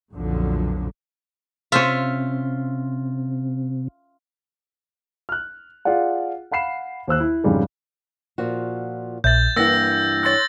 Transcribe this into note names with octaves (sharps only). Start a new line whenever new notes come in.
B1 F2 A#2 D3 F3 F#3
C3 C#4 F4 C5 E5 F5
F6 F#6
F4 G#4 D5 F#5
F5 F#5 B5 C7 E7
D#2 C5 E6 F#6
E4
F2 G#2 C#3 G3 G#3
A#2 F3 F#4
A#1 A#2 E5 G6 A6
G2 E3 A#3 F#5 E6 A#6
C#5 C6 E6 F#6 A6